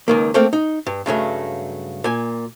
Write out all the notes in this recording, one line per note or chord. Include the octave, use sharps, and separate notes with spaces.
C#2 D#3 A#3
A3 A#3 C4 A4 F5
D#4
G2
G2 C#3 F#3 A3
A#2 G#5